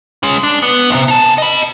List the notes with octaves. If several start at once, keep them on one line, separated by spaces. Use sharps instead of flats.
G#3 C#4
D4
B3
B1 C3
D#4 A5
D#5 B5